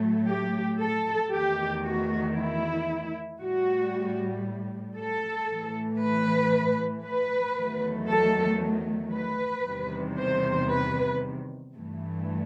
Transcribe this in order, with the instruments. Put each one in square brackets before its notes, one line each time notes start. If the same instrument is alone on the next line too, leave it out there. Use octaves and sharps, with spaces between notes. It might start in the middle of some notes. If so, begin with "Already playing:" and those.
Already playing: [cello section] A2 F#3 A3
G4
A4
E2 D#3 A3 G4
F#4
E4
A2 G3 F#4
A4
A2 E3 A3
B4
B4
E2 D#3 F#3 A3
A4
B4
E2 C3 D#3 G3
C5
B4
G2 E3 A3